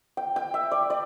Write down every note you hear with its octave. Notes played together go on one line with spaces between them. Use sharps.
G5
G5
E5
D5
D5